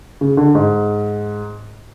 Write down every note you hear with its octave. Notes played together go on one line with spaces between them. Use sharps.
C#3
D3
G#2